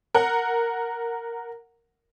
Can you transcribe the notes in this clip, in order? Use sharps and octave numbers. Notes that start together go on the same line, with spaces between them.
A#4 F#5